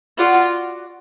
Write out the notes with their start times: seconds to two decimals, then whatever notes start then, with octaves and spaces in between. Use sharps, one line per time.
0.18 F4 F#4 D5 F#5